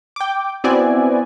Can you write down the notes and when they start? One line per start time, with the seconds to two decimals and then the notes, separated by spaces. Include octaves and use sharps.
0.16 G5 D6
0.64 B3 C4 E4 F#4 D5 G#5